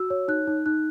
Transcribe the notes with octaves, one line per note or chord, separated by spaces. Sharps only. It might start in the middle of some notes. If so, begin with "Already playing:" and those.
Already playing: F#4 E6
C#5
D#4 F#6
D#4
D#4 F#6